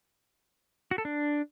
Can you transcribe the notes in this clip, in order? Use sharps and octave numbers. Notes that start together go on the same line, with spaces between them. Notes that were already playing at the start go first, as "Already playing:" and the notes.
F#4
A4
D4